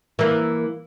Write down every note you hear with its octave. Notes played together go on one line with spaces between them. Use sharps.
E3 A#3